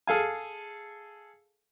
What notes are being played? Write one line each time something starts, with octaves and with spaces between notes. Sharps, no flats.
G#4 A4 F5 G#5